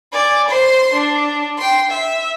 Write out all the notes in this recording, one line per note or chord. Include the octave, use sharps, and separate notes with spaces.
D5 G#5
C5 C6
D4
G5 C6
E5